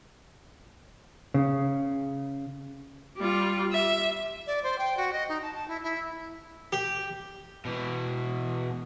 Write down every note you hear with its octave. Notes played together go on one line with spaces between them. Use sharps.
C#3
G3 F4
E5
D5
C5
G5
F#4
D#5
D#4
A5
A5
E4
E4
G4
B2 E3